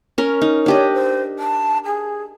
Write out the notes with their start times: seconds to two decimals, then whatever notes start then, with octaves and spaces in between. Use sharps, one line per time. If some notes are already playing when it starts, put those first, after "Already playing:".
0.18 C#4 A#4
0.41 D#4
0.66 D4 G4 C#5 D#5
0.94 C5
1.39 A5
1.85 G#4